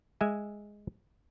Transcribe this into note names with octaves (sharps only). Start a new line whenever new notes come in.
G#3 E5 G#5